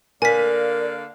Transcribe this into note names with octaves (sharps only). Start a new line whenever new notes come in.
D3 A#3 A#4 D5 F5 G#5 B6